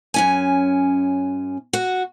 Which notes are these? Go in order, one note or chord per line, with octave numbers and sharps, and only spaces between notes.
F#2 C#4 G#5
F#4 F#5